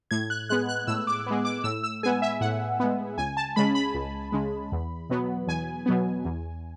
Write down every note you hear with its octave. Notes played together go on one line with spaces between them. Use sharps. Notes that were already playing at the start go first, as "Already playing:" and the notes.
A2 G#6
F#6
G#3 B3 F#6
F#6
A2 E6
D6
G#3 B3
D6
A2 E6
E6
G#3 B3 G#5
E5
A2 F#5
G#3 B3
C#2 G#5
A5
C#3 G#3 B5
B5
C#2
C#3 G#3
E2
B2 F#3 B3
E2 G#5
B2 F#3 B3
E2